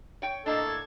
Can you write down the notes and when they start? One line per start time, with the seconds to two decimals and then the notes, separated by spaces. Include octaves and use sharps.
0.22 C#5 G5
0.46 A2 A#3 D4 A4 D#5
0.66 G#6